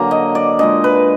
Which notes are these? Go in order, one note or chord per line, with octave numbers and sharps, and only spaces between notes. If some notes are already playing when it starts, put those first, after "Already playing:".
Already playing: D3 F#3 A#3 G#5 A#5
D#5
D5
A#2 G#3 D4 D#5
B4